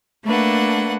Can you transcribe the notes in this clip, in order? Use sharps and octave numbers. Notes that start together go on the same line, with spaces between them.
A3 A#3 D4 B4 F#5